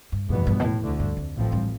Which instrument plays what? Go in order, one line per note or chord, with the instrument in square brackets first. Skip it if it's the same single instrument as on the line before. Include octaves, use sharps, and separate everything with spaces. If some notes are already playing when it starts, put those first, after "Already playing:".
[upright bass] G2
[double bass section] F1 E2 B2 B3 [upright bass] G2
[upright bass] G2
B2
A2
[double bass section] D2 D3 A3
[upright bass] G2
F2
[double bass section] A1 A2 F3 C4
[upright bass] G2